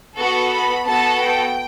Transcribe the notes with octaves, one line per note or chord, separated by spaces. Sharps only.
B3 F#4 A4 C#6
B5
B3 F#4 A4 A5
G5